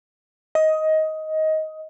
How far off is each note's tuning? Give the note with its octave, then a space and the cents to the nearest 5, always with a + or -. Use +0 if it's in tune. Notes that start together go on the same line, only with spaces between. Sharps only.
D#5 +15